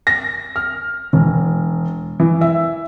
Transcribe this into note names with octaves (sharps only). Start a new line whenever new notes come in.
A#6
F6
E1
E3
E5